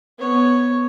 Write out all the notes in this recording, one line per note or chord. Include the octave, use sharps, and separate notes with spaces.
B3 C#5